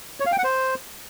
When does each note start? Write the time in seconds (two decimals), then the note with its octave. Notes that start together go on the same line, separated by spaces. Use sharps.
0.20 C#5
0.26 F5
0.32 G5
0.38 F#5
0.44 C5